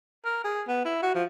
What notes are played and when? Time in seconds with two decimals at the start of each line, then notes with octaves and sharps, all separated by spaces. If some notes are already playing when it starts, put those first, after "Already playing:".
0.25 A#4
0.44 G#4
0.68 B3
0.85 E4
1.02 F#4
1.15 F3